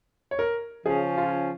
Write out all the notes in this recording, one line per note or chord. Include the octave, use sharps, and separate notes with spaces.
C#5
A#4
C#3 F3 C#4 G#4
F4